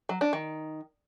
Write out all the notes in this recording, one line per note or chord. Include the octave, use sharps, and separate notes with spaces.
F#3
D4
D#3